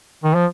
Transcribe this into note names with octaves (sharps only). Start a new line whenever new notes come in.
D#3
F3